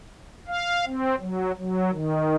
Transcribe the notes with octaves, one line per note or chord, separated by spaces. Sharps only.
F5
C4
F#3
F#3
D#3